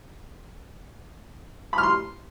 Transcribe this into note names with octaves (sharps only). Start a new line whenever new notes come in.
B5
F6
C6